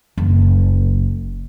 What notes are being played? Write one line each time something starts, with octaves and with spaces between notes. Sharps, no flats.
F#1